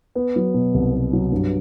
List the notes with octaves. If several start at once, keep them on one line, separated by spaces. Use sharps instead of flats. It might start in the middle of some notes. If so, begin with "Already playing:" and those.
B3
F#3
B2
C2
B3
F#3
G2